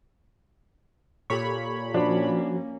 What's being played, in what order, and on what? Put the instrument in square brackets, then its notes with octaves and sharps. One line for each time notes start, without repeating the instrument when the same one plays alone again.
[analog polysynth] A#2 C#5 B5 [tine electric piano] G4 A4 C#6
[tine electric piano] F3 F#4 [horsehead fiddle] A#3 C#4 [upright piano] D4